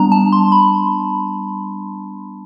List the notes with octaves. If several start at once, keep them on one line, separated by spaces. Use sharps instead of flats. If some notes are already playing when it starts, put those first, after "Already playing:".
Already playing: G3 B3 D4 A#5
A5
C6
B5